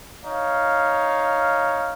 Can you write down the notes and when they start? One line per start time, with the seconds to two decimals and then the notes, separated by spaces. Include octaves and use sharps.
0.23 D#4 C#5 F5